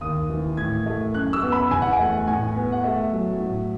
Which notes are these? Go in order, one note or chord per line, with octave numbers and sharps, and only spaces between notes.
D#2 D#6
E3
A2 G#6
A3
F#2 F#6
E6
B3
B5
E2 G#5
F#5
G#5
A3
A2 G#5
B3
F#5
A3 E5
F#3
A2